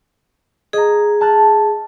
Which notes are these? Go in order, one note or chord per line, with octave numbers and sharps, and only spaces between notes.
G#4 D#5 A#5
A5 F6 F#6